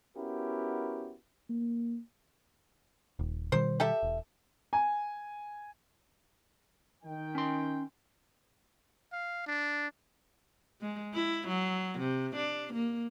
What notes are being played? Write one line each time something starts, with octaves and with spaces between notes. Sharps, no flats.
B3 C#4 E4 F#4 G4 A#4
A#3
D#1
B2 D#3 G3 C5
G4 A4 E5
E1
G#5
D#3 G5
C#4 C6
F5
D4
G#3
E4
F#3
C3
D4
A#3